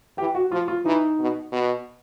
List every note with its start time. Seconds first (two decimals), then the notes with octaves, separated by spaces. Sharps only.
0.17 E3 G4
0.35 F#4
0.52 F3 F4
0.68 F4
0.85 E3 D#4
1.19 B2
1.52 B2